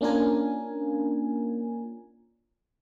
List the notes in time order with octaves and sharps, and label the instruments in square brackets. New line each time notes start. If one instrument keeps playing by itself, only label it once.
[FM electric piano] A#3 C#4 D4 F4 A#4 G#5